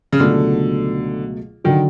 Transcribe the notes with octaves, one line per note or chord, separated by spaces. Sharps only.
C#3
C#2 B2 D3 F#3 A3
D3 D#3 F#3